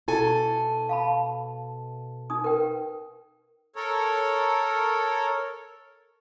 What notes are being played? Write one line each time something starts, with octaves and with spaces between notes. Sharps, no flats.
B2 E4 A4 G#5
F5 A5 B5
D#4 D#6
A#4 B4 G5
A4 A#4 C#5